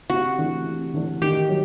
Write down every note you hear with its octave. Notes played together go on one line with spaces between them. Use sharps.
C3 F#4
E3 A3 D4
C3
E3 A3 D4
D#3 G4
F#3